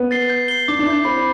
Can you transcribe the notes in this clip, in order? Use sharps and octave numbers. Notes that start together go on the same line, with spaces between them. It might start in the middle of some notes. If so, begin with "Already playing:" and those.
Already playing: B3
A6 C7 G7
G6
C7 G7
D4 D6
D4
E4 G6 C7
C4 B5